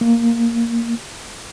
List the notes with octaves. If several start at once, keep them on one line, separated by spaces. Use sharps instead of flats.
A#3